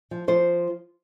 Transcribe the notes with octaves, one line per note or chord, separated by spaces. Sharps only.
F3
F3 C5